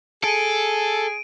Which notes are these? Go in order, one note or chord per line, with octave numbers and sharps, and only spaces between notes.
G#4 A4 D7 D#7